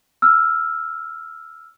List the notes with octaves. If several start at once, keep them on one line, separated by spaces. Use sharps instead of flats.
E6 F6